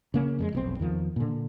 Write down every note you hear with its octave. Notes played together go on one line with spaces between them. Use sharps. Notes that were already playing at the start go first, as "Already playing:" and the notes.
C#3 A#3 C#4
F2 G3 G#3
F1 B1 C4
E2 D#3 F3
A#2 D3